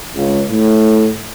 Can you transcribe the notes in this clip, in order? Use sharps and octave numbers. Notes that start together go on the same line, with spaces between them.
C#2
A2